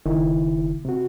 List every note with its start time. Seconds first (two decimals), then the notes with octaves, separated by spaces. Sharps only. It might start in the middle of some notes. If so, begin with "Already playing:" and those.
0.06 F#1 D#3 E4
0.85 C3 F#4